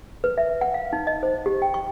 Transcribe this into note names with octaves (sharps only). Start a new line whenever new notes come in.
B4
E5
F#5
F5
D#4
D#5
C5
G4
G5
C#6